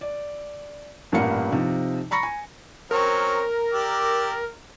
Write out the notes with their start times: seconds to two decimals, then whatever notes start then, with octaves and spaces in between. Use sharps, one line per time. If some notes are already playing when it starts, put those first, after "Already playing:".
0.01 D5
1.12 A1 G2 A#2 A#4 F#5 C#7
1.52 C3 F3 D#4
2.11 A#5 B5 C#6 A#6 C#7
2.23 G#5
2.91 F#3 C4 C#4 A#4
3.73 G4 D5 E6